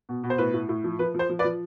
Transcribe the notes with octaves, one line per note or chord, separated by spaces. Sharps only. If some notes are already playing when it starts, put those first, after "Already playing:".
B2
B2
C5
A2 B4
A2
A2
F3
F3 B4
F3 C5
F3
B4 D5
F3